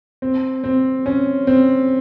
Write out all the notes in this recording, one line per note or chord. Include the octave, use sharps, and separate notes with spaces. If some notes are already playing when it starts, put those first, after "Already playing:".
C4
C4
C#4
C4